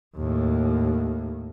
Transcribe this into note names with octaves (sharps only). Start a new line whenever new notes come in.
D#2 A2